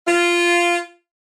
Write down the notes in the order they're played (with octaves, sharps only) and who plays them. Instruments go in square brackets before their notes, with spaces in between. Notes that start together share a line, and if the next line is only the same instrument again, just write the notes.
[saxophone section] F4